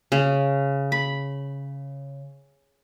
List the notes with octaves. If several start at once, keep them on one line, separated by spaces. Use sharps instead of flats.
C#3
B5